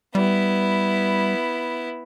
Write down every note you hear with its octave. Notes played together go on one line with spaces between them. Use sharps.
G3 B3 E4